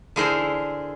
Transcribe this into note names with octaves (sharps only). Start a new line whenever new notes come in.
D3 E4 G#4 A#4 C5